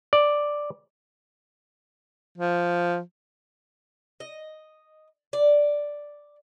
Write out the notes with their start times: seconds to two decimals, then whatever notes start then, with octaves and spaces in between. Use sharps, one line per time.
0.13 D5
2.38 F3
4.20 D#5
5.33 D5